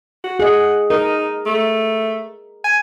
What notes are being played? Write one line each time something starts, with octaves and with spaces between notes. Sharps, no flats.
F#4
G#4 D#5 F#5
D#4 A#4
A3
G#5